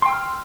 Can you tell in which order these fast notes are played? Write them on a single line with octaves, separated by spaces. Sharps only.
C6 G5 E6 F6